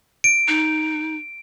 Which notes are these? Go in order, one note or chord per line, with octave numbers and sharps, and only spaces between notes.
D7
D#4